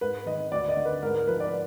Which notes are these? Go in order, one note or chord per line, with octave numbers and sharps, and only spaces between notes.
G#2 B4
D#3 D#5
D2 D5
D#5
D3
B4
G#2 A#4
A#4
F3 B4
D5